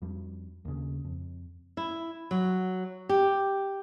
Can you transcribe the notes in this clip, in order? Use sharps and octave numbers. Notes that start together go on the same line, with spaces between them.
F2 G3
D#2 C#3
F2
E4
F#3
G4